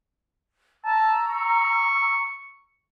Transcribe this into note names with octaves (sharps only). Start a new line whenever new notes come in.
A5 A#5 E6
C#6